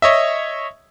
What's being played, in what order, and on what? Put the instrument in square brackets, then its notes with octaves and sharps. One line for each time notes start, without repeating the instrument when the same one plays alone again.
[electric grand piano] C#5 D#5 E5